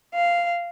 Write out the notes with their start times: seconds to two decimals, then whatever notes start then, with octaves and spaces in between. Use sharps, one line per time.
0.14 F5